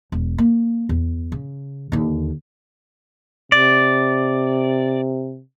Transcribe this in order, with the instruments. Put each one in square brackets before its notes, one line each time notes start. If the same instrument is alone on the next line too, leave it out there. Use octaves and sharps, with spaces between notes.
[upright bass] E1
A#3
E2
C#3
D#2 D3
[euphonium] C3 [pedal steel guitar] D5